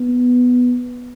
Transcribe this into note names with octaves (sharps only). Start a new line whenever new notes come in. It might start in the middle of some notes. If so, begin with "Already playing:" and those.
Already playing: B3